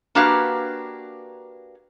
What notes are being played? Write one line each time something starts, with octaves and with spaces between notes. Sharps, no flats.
A#3 D4 F#4 G4 B4 F5